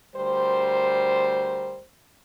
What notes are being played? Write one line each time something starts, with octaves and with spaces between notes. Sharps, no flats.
D2 G3 A#4 C5